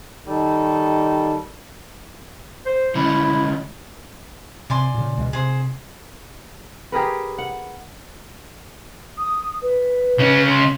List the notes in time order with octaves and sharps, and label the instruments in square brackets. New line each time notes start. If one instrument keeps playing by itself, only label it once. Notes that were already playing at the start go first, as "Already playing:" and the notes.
[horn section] D#3 G3 A4
[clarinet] C5
[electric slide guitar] D3 G#3 C#4 [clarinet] E4
[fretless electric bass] C3 [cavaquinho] D5 G#5 C6
[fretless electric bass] A#2 C#3
C#2 B2 G#3
[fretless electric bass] C3 [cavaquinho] G#4 C5
[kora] G4 G#4 A#4 B4
F#5
[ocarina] D#6
B4
[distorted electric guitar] C#2 C#4
[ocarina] C6